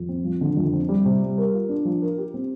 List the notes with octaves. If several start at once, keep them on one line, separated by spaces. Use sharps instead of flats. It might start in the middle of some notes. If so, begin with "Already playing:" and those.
Already playing: F2
C4
F3
D3
F2
C4
G3
C3
G3
A#4
F4
D4
F3
A#4
G4
C4